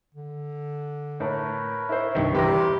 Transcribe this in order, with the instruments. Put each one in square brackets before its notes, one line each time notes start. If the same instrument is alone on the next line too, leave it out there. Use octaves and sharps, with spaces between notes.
[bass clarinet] D3
[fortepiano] A2 [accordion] A#4 B4 C#5
[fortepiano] E4 A4 C5
[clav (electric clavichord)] C2 G2 D#3 [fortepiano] E5 C#6
[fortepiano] E2 C3 E3 [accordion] E4 [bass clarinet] G4 [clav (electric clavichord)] B4 A#5